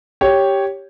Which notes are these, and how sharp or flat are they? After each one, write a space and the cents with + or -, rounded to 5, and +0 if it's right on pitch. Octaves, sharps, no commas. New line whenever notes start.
G4 +0 C#5 +0